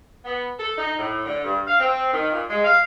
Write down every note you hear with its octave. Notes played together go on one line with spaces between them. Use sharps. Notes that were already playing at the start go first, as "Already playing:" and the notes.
B3
A4
D#4
A2
D3
G2
F5
C4
D#3
A#2
G#3
F5